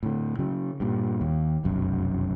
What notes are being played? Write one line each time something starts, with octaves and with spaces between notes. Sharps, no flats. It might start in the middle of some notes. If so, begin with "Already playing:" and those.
A2 D3
C#3 F#3
G2 A#2
D#2
F1 B1 F#2